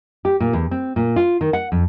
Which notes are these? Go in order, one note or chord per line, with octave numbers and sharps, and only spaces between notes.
G4
A#2
E2
C4
A#2
F4
D#3
F#5
F2